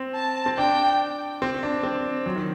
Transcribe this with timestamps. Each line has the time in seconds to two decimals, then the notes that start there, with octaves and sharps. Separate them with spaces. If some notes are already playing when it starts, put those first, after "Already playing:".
Already playing: C4
0.15 A5
0.46 C4
0.58 D4 G5
1.42 C4
1.63 D4
1.83 C4
2.26 F#3
2.36 D#3